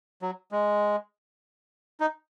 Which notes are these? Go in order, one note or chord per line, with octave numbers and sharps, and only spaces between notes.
F#3
G#3
D#4